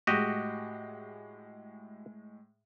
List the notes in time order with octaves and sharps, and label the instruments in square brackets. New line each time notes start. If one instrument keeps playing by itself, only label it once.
[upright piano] A2 G#3 [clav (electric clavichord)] F#4 G4 D#5